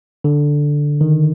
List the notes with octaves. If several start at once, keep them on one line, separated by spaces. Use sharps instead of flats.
D3
D#3